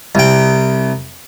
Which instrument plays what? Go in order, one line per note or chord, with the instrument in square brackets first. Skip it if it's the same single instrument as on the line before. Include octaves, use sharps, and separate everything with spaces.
[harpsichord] C2 G5